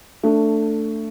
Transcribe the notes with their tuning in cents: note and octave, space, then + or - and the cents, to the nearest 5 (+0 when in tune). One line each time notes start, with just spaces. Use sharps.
A3 +15 D4 +0